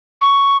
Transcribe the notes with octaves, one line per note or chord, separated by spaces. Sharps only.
C#6